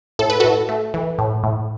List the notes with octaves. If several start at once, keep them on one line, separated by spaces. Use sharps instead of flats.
A2 A4
B4
A2 F#4 A4
A3
E3
A2
A2